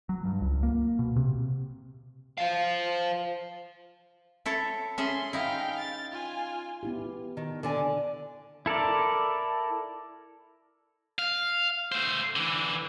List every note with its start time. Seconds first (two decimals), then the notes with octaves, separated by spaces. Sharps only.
0.09 F#3
0.25 G2
0.42 C#2
0.63 A#3
0.99 B2
1.16 C3
2.38 C5 F5
4.46 E4 A4 C#5
4.98 C#4 G#4 E5 C6
5.33 D#4 E4 F5 G5
5.79 A6
6.11 F4 G#5
6.83 B3 E4 G4
7.37 D#3
7.63 D3 D5 G#5
8.66 E4 A4 A#4 D5
11.19 F5
11.92 A3 C5
12.36 D3 E3